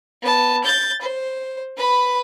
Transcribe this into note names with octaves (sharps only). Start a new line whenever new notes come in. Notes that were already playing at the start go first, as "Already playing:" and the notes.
B3 A5
G6 A6
C5
B4 B5